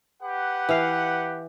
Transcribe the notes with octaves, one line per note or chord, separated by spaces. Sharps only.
G4 B4 F#5
E3 F5